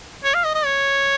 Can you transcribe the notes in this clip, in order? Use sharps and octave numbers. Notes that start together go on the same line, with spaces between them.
C#5
F5
D#5
D#5
C#5